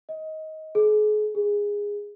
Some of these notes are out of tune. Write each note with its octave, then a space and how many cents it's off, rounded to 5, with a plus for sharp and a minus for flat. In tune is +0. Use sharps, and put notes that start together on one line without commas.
D#5 +15
G#4 +40
G#4 -15